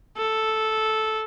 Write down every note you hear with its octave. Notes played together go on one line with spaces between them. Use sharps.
A4